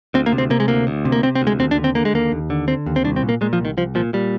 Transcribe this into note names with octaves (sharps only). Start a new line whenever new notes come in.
D2 C4
A#3
C3
C4
C3 A#3
G#3
D2 A#3
D2
C3
A#3
C3 C4
C4
D2
G#3
D#2 C4
D4
D3
C4
D3 A#3
G#3
D#2 A#3
D#2
D3
D3 C4
D#2
C4
C2 D4
C4
A#2
A#3
A#2 G#3
F3
C2
D#3
C2 F3
A#2 F3
A#2 G3